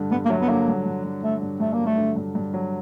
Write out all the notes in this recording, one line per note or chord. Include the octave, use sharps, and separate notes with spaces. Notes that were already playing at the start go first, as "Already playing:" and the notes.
Already playing: G2 D3
G2 B3
A#3
F#3 A3
B3
D3 A#3
G2
G2
F#3
D3 A3
G2
G2 A3
A#3
F#3
A3
D3
G2
G2
F#3